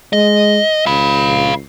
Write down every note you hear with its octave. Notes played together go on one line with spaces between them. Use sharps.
G#3 D#5
C#2 F5 B5